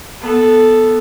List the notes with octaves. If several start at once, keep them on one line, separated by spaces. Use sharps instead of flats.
B3 A4